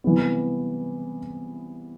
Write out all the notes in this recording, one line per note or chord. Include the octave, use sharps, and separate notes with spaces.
C3 E3 G3 B3